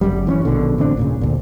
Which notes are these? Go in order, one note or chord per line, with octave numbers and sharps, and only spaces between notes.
G1 F#2 G3
E3 C4 C#4
A#1 B2 D3
A1 D3 C4 D4
D#1 A#2 C#3
D2 A#2